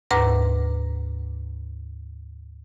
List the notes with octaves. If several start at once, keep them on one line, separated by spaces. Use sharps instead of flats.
D2 G#2 B4 A#5 D6 A#6